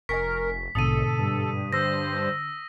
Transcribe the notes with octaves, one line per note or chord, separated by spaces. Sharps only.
F1 A#4 D#5 G#5 C#6 B6
A#1 G#2 B2 D3 A4 D#6 D#7
G2
D3 C5 E6 A#6